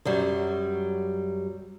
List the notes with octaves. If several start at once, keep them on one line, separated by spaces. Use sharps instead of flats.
F#2 F#3 G3